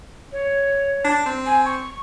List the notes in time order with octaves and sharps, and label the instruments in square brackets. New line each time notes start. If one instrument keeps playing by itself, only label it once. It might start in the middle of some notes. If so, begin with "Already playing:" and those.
[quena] C#5
[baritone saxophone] D4
C4
[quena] G#5
C#6